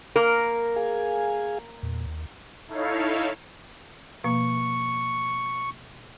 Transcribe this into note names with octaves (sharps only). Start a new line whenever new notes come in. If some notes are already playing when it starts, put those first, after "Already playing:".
A#3 A#4
G#4 F5 G#5
E2 A#2
D#2
D#4 E4 A4 C#5 F5
B2 F3 A#3 C#6